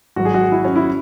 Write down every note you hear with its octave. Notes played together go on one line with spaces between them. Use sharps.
G#1 G#2 F#3 F#4
G#4
F#4
E4
C#4
E4